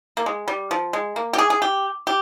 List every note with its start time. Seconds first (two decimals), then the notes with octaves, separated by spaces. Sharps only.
0.17 A#3
0.26 G#3
0.48 G3
0.71 F3
0.93 G#3
1.16 A#3
1.33 G4
1.38 G#4
1.50 G#4
1.62 G4
2.07 G4